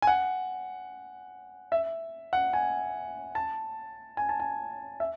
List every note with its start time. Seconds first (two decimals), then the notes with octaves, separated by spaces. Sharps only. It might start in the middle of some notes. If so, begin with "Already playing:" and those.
0.02 G#5
0.07 F#5
1.72 E5
2.33 F#5
2.53 G#5
3.35 A5
4.17 G#5
4.29 A5
4.40 G#5
5.00 E5